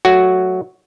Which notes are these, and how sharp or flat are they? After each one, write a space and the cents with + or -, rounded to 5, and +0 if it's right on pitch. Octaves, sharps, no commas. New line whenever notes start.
F#3 +0 A3 +0 F#4 +0